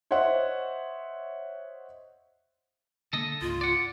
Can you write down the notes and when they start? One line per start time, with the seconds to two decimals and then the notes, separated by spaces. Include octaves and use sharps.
0.11 C5 C#5 D#5 E5 F#5
3.13 D3 A#3 A4 D#5
3.41 C#2 G#2 F4
3.61 D5 F#5